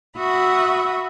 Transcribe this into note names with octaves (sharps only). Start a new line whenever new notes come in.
F#4 E5 B5 D#6